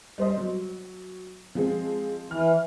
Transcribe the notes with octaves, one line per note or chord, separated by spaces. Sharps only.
G3 C5 D#5
F#3
F3 G#3 C4
E3 F6